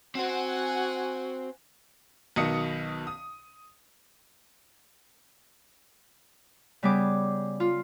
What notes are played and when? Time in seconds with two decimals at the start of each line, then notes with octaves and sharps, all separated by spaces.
0.15 C4 F#4 C5 F#5 G#5
2.36 B1 B2 D#3 D#5 D#6 C#7
3.07 D#6
6.83 C#3 G3 B3 G#4 D6
7.60 F4